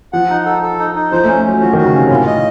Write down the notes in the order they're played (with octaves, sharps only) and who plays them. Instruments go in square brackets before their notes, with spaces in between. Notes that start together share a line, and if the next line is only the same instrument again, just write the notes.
[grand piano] F3 [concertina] F#5
[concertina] D#4
A4
A4
D#4
D#4
[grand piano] F3 [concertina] C5
[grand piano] A3
[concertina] C#4
[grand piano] F#3 [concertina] C#4
[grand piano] F3 [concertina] F#4
[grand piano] D#3
[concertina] F#4
[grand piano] C#3
[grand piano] C3 [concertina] C#4
[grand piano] A2 [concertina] F4
[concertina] D#5